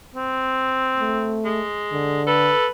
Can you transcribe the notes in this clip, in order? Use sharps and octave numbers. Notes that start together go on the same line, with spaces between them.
C4
A3
G#3
D3
A4 B4